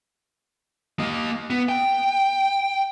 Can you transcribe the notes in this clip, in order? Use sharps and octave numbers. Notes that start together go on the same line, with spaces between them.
A#3 D#5
B3
G5